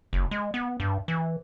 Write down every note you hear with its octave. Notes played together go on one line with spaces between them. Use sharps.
F#1
G#3
B3
G2
E3